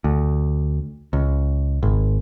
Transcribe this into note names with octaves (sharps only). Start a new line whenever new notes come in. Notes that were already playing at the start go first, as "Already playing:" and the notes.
D2
C#2
G#1